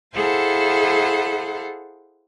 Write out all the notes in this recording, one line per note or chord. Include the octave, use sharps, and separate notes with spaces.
E4 G#4 A4 C5 F5 F#5